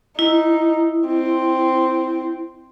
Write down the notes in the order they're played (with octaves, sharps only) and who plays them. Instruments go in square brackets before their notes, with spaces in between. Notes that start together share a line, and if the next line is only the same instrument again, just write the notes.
[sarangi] D#4 [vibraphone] E4
[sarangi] C4